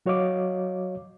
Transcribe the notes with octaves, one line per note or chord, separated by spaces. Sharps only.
F#3 F#4 C#5 D#5 F5 D6